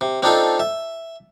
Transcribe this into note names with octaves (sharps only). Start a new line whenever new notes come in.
C3
C4 D4 D#4 F4 A4
E5